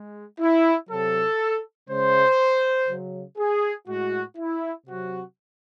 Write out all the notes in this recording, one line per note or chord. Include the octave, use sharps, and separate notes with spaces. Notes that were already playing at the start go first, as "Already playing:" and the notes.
Already playing: G#3
E4
C3 F#3 A4
C#3 G#3 C5
C#3 F#3
G#4
A2 G#3 F#4
E4
C3 F#3 F#4